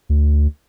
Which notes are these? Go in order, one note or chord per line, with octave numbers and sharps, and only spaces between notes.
D2